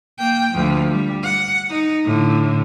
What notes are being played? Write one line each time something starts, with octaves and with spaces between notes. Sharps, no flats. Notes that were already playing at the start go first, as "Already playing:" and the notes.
A#3 G5
D2 F3
G3
F#5
D#4
A2 D3